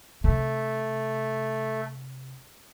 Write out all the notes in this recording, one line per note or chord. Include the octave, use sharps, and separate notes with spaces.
C3 A3